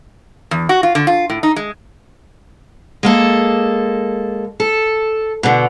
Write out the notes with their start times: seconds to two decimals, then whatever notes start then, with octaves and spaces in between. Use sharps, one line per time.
0.51 E2
0.69 F#4
0.83 F4
0.95 D3
1.07 F4
1.30 A2
1.43 D#4
1.56 G#3
3.03 G#3 A#3 A4
4.60 A4
5.43 B2 D3